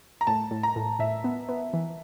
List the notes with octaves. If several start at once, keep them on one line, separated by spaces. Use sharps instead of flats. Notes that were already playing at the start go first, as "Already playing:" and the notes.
A#5
A2 A5
A2
A#5
A2
A2 E5
B3
B3
E3